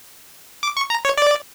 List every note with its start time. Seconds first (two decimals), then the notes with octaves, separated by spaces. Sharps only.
0.63 D6
0.77 C#6
0.90 A#5
1.05 C#5
1.17 D5